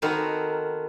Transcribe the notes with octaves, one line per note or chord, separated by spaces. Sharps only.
D#3 B3 C4 F#4 A4 A#4